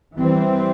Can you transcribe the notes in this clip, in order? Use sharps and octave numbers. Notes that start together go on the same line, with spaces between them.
E3 G3 C4